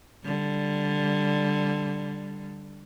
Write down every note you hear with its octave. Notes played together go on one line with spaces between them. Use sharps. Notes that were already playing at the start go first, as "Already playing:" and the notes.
D3 G3